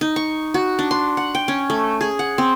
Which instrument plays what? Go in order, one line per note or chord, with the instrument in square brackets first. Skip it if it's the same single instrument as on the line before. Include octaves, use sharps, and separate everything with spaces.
[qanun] D#4
C#6
F#4
D4
C6
F#5
G5
C#4
A3
G#4
F#5
C4